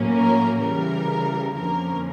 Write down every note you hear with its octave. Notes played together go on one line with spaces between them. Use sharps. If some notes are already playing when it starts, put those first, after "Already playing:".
Already playing: A2 F#3 A#3 C#4
A#4
C#3 E3 G3 A#4
F2 D3 F3 A#3 C#4 A#4